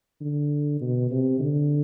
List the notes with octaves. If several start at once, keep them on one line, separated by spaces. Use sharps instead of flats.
D3
B2
C3
D3